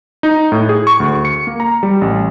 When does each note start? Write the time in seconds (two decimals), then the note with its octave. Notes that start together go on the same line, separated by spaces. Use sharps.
0.23 D#4
0.52 A2
0.69 G#4
0.87 C#6
1.00 D2
1.25 C#7
1.47 A#3
1.60 A#5
1.83 G3
2.01 A1